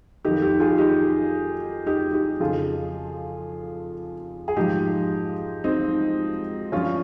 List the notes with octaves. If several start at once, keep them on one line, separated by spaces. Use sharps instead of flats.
F2 D#3 D#4 G4
D#4 G4
F4 G#4
D#4 G4
D#4 G4
D#4 G4
F2 C#3 F3 F4 G#4
G#4
G#2 F3 D#4 G4
C4 D#4
G2 F3 C#4 F4